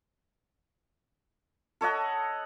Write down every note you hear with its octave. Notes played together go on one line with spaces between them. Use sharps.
A4 C#5 D#5 F#5